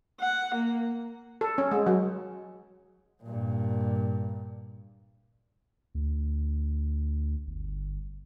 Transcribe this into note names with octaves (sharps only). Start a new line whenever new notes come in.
F#5
A#3
A4
C#4
G#3
F#3
G2 A#2
D2
G1